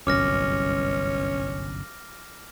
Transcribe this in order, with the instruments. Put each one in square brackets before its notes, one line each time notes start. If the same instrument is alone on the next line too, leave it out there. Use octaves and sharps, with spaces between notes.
[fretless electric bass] G1 C2 F#2 [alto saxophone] C#4 [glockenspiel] D6 F6 A#6